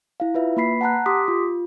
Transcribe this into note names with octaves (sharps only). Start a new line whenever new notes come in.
E4 F5
F4 B4 E5
A#3 B4 B5 B6 C7
F#5 A5 A#5 F#6
G4 C6 D6 D#6 B6
F4